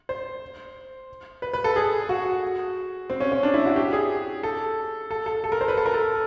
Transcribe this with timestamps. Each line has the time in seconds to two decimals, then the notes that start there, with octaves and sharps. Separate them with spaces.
0.09 C5
1.42 B4
1.53 B4
1.64 A4
1.76 G#4
2.09 F#4
3.10 C4
3.20 C#4
3.32 C#4
3.43 D4
3.54 E4
3.66 F#4
3.76 G4
3.93 G#4
4.43 A4
5.11 A4
5.26 A4
5.44 A4
5.52 A#4
5.61 C5
5.68 B4
5.77 A4
5.86 A#4
5.94 A4